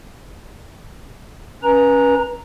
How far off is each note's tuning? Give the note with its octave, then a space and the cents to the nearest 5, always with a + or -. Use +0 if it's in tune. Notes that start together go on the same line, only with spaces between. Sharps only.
C#4 +0 B4 -30 A#5 +0